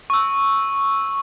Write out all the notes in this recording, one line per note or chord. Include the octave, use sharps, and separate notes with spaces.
C#6 E6